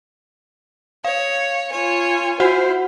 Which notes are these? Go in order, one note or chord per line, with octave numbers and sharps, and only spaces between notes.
C#5 F5
F4 C#5 G#5
E4 F#4 C5 F#5